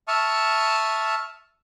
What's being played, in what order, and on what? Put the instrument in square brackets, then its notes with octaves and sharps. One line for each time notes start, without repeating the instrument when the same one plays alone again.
[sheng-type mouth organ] E5 A5 C#6 D#6 F6